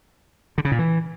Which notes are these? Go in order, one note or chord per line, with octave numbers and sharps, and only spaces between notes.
D3
C#3
A#2
E3